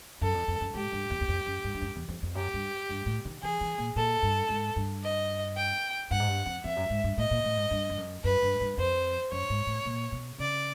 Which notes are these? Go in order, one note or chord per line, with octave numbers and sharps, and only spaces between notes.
F#2 A4
F2
F2
F#2
G#2 G4
G2
E2
E2
F2
F#2
G2
G2
F#2
E2
F2
F2
F#2 G4
G2
G2
A2
D#3
E3 G#4
E3
A#2
A#2 A4
G2
G#2
G2
D#5
G5
G2 F#5
G#2
G2
F2
F2 E5
F#2
G#2
G2
A2 D#5
A#2
A2
G#2
G2
G2
F#2
F#2 B4
G2
G2
F2 C5
F#2 C#5
G#2
A2
A#2
B2
C#3 D5